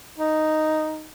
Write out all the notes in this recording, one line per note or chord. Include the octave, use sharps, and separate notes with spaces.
D#4